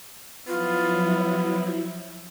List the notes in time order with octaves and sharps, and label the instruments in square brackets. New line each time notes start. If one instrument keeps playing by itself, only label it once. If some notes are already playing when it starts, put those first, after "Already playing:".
[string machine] F3 F#3 E4 [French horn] B3 [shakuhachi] F4